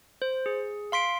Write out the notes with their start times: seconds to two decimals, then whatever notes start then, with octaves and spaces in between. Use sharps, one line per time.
0.22 C5
0.46 G#4
0.92 F5 C6 B6 D7